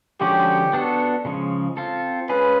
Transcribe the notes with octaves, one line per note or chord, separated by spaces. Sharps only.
D3 F3 G#3 C#4 F#4 G4
B3 D4 F#4 A4
C#3 F3 G#3
C4 F4 A4
G#3 C#4 F4 G#4 B4